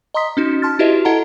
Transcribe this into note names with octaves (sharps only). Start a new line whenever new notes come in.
D#5 A#5 C6 D#6 B6
C#4 D#4 F#4
A5 C6 F6 A6
E4 F#4 G4 B4 D#5 E5
E4 A4 D#5 F#5 A5 A#5